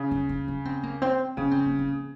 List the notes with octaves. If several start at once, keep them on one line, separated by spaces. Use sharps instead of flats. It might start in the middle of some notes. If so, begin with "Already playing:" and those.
Already playing: C#3
C#4
C#4
C#4
C4
A#3
C4
C#3 C#4
C4
A#3
C4